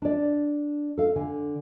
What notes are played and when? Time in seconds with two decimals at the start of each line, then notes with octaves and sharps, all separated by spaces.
0.02 D4 D5
0.98 A4 F5
1.16 D3 G#5